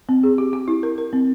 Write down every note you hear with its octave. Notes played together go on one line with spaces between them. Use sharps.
C4
G#4
G4
G4
E4
A#4
A#4
C4